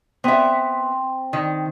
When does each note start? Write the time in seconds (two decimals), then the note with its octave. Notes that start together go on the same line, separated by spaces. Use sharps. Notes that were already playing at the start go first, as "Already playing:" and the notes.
0.24 B3 C4 E5
1.33 D#3